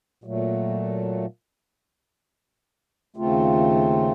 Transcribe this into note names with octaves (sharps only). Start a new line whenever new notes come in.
A#2 F#3 A3
D#2 C#3 A3 C4 F4